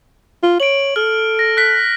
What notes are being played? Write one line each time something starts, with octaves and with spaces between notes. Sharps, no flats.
F4
C#5 D7 F#7
A4 F6
A#6
F#6 B6